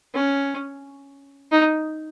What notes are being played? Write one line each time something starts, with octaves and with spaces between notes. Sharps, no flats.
C#4
D#4